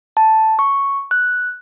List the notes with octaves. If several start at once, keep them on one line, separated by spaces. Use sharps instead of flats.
A5
C#6
F#6